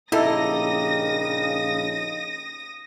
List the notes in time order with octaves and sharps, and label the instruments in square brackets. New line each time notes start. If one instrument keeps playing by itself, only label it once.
[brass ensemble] A#1 C#3 [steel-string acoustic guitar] D#4 G4 [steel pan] E4 A4 [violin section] D#6 A#6